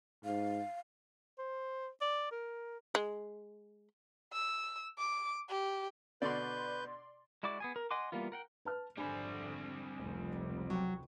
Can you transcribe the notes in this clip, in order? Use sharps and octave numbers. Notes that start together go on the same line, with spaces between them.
G#2 F5
C5
D5
A#4
G#3
E6
D6
G4
B2 D3 B4 D5 C6 G6
G#3 E4 F#4 D5 D6
B3 G#4 G#5
A#4
D#5 F#5 G#5 C6 D6
E3 G3 A#3 B3 F4
A#4 F#5 G5
B4 A5 F6
G#1 F2 D3 G3 C4 D4 G#5 B5
F1 C#2
F#3 G5 C#6